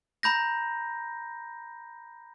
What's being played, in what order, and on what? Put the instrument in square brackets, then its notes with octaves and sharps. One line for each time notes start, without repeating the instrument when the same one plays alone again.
[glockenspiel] A#5 B5 G6 A#6